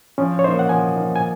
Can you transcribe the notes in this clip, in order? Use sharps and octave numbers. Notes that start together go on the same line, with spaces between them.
F3 C#4
C#5
A#3 D#4 C5
F#5
F3 G#5
A#3 D#4
G#5